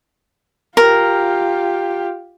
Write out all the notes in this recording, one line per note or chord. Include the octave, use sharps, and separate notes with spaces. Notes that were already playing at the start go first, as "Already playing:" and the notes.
F4 G4 A#4